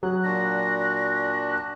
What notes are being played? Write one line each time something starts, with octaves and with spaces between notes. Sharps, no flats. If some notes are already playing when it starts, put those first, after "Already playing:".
F#3 G#4 F#6
A#2 D4 F#4 A#6